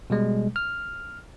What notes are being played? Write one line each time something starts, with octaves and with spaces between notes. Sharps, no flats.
B2 G3 G#3
F6